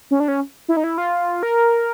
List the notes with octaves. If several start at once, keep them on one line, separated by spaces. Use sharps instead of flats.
C#4
D4
C#4
E4
D#4
E4
F4
A#4